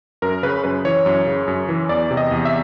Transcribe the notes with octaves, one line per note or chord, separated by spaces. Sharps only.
F#2 A#4
C#3 B4
F#2 B4
E3 C#5
F#2
C#3
F#2
E3
E2 D5
C3
D#5
E2
E5